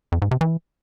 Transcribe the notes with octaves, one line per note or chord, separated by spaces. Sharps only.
F2
G#2
C3
E3